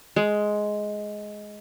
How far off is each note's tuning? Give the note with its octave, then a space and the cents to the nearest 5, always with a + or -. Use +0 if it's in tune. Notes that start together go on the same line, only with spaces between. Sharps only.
G#3 +10